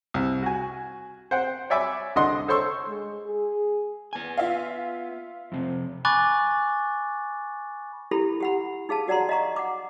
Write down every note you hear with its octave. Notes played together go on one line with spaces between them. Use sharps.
C2
F#4 G#5
C5 F#5 G5
C#5 D5 E5 G#5 B5 D6
C2 D3 D4 D#5 F#5 C6
A4 C5 C#5 C6 C#6 E6
G#3
G#4
B3 G#5
F4 E5 F5
F2 C3
G#5 B5 C#6 D6 F#6 A6
E4 G4 A4 B5
G4 F#5 B5
D#4 G#4 F5 A5
F#4 D5 F#5 A#5 C6
D#5 F5 A#5 C#6
F#5 D6